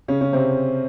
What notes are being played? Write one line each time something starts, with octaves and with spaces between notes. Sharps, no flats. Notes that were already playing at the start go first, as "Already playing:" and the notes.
C#3 C#4
C#3 C#4
C3 C4